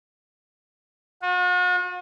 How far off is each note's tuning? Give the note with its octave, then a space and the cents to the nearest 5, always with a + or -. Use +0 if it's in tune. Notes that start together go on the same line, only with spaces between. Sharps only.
F#4 -45